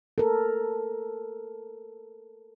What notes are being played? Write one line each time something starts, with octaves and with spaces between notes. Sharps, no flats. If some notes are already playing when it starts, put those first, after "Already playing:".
A4 A#4